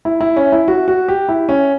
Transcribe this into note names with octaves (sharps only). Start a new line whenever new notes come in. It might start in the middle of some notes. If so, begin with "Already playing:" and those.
E4
E4
C#4
E4
F#4
F#4
G4
E4
C#4